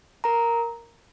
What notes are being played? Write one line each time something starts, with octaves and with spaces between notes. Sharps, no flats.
A#4 A#5